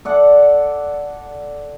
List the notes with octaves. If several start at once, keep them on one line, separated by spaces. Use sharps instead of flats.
A4 D5 F#5